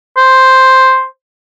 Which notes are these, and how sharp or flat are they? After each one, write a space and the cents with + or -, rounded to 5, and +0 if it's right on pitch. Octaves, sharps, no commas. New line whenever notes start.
C5 +0